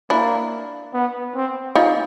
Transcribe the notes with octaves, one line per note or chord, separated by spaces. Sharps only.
A#3 D4 E4
B3
C4
D#4 F4